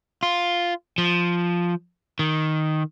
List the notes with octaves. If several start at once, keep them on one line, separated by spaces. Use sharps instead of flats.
F4
F3
D#3